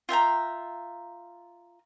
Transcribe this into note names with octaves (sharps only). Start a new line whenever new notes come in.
F4 E5 G5 A#5